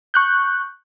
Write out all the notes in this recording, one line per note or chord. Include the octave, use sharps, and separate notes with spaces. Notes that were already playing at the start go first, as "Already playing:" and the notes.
C#6 F#6 G6